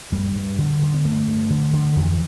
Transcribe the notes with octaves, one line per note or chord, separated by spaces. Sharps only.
G2 G3
G2
D3
D3
B3
G2 A3
G2
D3
D3
F2 E3